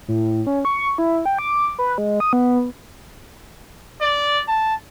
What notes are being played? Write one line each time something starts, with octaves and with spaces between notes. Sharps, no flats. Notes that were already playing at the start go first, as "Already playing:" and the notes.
A2
C#4
C#6
E4
G5
D6
B4
G#3
D#6
B3
D5
A5